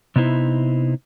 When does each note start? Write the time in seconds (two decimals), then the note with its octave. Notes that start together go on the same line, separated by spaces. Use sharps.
0.16 C3 B3 D#4 E4 C5